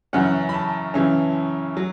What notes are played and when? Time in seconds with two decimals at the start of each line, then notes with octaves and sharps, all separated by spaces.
0.13 F#2 C#3 E3 C#4 F#5
0.49 B5
0.54 A5
0.94 F#2 C#3 E3 C#4
1.77 F#3